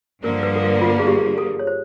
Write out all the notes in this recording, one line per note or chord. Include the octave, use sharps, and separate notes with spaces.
G2 D3 F3 A#3 A#4
B4
A4
A#4
F4
G#4
G4
G#4
A4
C#5
C5